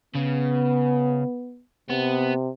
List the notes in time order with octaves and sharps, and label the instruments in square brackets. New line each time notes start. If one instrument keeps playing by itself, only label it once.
[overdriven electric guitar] C#3 [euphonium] B3
[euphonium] C3 [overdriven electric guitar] B3